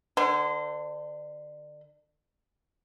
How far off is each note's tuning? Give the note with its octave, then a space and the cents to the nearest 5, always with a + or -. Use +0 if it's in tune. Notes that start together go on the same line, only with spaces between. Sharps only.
D3 +30 C5 -30